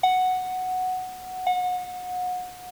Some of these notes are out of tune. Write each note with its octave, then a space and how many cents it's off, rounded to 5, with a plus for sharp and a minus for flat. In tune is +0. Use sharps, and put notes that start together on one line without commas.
F#5 +0
F#5 -30